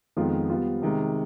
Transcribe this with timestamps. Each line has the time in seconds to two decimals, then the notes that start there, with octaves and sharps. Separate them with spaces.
0.17 F2 D#3 G#3 B3 F4
0.49 G3 B3 F4
0.82 C3 D#3 G#3